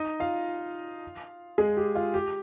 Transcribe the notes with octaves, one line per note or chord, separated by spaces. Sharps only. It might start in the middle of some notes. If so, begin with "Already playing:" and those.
Already playing: D#4 D#5
F4 F5
G#3 G#4
G4
F4
G4